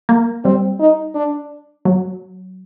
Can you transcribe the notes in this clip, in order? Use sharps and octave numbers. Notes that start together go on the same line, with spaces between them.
A#3
G3 C4
D#4
D4
F#3